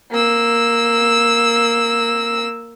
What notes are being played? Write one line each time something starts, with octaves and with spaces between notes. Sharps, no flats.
A#3 E6